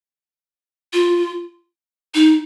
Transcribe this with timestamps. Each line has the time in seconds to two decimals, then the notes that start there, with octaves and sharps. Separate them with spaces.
0.93 F4
2.15 D#4